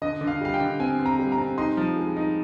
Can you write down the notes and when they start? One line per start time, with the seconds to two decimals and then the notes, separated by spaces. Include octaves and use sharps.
0.02 D3 D#5
0.21 D3
0.27 F5
0.41 G3 F5
0.54 G5
0.60 D3
0.80 C4 G#5
0.99 C4
1.06 A#5
1.19 G3
1.32 A#5
1.38 C4
1.58 D#4 C6
1.77 F3
1.97 G#3
2.17 D#4